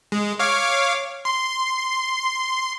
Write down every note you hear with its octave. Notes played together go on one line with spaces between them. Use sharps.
G#3
C#5 F5 D6
C6